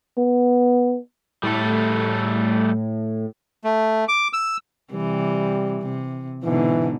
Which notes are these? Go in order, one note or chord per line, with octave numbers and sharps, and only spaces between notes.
B3
A2 G3 A3 A4
A3
D6
E6
C3 E3 G3
C3
G#2 B2 D3 E3